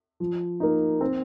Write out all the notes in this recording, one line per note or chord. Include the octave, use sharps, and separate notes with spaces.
F3
A#3 D#4
C4